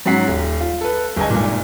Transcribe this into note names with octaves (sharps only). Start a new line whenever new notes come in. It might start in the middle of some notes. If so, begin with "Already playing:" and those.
G#2 F#3 C#4 F#5 B6 C7
D#1
F4
A4 B4
G1 G#4 A4 D#5 G#5
G#1 G2 A#2